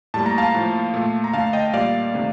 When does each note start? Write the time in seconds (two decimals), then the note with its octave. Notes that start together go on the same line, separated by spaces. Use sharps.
0.14 A2 G3 A#3 A5
0.26 A#5
0.38 F5 A5
0.54 A2 F3 A#3
0.94 A#2 A3
1.24 A#5
1.33 D3 A3 F5 A5
1.53 D#5 G5
1.73 A#2 G3 A#3 D5 F5
2.14 C3 D#3 A3